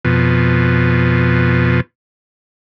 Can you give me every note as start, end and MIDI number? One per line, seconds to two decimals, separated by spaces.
0.05 1.80 41
0.05 1.80 47